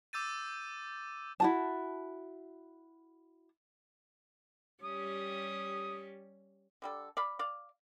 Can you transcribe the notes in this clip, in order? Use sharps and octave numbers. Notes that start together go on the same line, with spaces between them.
D6 E6 G6 A6 D#7
E4 F#4 A5
G3 C#4 G4 D#6
D3 G3 A4
D5 F5 B5
D5 F5